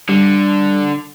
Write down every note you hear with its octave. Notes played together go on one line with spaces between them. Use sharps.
D3 G3